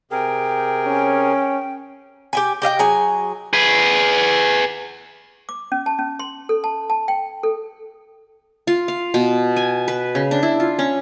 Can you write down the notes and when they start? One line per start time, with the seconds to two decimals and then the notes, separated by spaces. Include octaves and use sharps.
0.11 C3 G#4 A#4 G5
0.87 C#4
2.33 G4 G5 G#5
2.62 G4 D#5 F5 G5
2.79 F#3 G#4 G#5
3.53 G#4 B4
5.49 D6
5.72 C#4
5.86 A5
5.99 C#4
6.19 C6
6.49 A4
6.64 A5
6.90 A5
7.08 G5
7.43 A4
8.67 F4
8.88 F5
9.14 B2
9.56 G#5
9.88 B4
10.15 C#3
10.31 D4
10.43 E4
10.60 F4
10.79 C#4